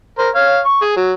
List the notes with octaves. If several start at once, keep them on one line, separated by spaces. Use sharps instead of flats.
A#4 C5
C#5 F5
C#6
G#4
F#3